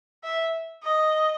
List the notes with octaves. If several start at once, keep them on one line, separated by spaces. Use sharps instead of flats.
E5
D#5